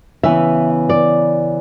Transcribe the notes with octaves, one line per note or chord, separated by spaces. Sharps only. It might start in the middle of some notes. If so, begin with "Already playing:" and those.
C#3 E3 B3 E5
D5